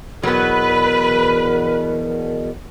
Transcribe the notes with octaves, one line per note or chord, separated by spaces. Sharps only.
E2 B2 F#3 B3 A#4 B4